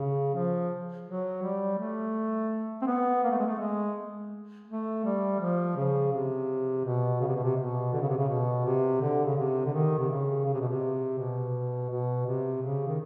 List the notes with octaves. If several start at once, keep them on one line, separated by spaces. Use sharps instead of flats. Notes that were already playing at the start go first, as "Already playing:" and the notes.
Already playing: C#3
F3
F#3
G3
A3
C4
B3
A#3
A3
G#3
A3
G#3
A3
G3
F3
C#3
C3
B2
C#3
C3
B2
C3
B2
D3
C#3
C3
C#3
B2
C3
D3
C#3
C3
D3
D#3
C3
C#3
C#3
C3
B2
C3
B2
B2
C3
C#3
D#3